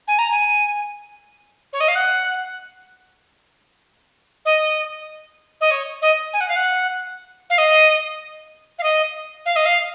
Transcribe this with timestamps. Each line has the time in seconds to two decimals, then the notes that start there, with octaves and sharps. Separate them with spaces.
0.07 G#5
0.18 A#5
0.31 G#5
1.73 C#5
1.80 D#5
1.88 F5
1.95 F#5
4.45 D#5
5.60 D#5
5.70 C#5
6.02 D#5
6.33 G#5
6.40 F#5
6.48 F5
6.56 F#5
7.50 F5
7.58 D#5
8.78 F5
8.83 D#5
9.45 F5
9.56 D#5
9.65 F5